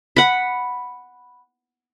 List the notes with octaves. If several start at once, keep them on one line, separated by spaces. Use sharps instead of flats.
F#5 B5